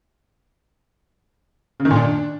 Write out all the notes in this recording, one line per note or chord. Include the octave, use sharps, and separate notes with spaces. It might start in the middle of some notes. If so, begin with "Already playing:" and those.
C#3
D#3
A#2
D4